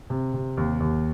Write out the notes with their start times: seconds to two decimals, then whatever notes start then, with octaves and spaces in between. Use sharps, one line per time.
0.10 C3
0.34 C3
0.57 D#2
0.80 D#2